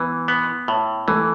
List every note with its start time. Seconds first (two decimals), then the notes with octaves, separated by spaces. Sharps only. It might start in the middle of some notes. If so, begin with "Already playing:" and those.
Already playing: E3 B3
0.28 B3
0.68 A2
1.08 E3 A3